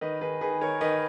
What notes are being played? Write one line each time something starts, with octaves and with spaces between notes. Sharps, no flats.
D#3 B4 D#5
D#3 G#4 B4
D#3 G#4 B4
D#3 A#4 C#5
D#3 B4 D#5